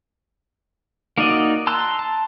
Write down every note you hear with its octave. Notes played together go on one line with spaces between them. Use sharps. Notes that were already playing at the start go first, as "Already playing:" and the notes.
A#3 D#4 F#4 D5 D#5
A5 A#5 C6 E6 F#6
A5